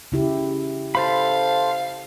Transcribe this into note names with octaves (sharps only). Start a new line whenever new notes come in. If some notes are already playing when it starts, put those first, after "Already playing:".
C#3 E4 G4
A4 C5 F5 B5